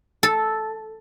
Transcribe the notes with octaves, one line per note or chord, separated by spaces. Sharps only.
A4